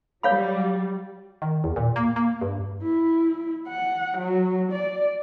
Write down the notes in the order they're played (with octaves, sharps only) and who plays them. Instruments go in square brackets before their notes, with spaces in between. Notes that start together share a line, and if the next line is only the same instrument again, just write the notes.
[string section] F#3 G3 [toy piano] C#5 F5 B5
[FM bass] D#3
E2
A#2
A#3
A#3
G2
[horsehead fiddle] E4
F#5
F#3
D5